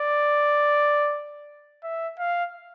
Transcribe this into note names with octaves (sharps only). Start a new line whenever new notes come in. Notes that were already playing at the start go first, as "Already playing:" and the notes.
Already playing: D5
E5
F5